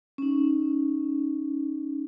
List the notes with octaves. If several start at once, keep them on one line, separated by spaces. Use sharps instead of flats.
C#4 D#4